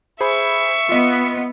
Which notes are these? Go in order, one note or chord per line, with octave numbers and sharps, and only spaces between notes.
G#4 C5 E5 B5 C#6
B3 F4 D#5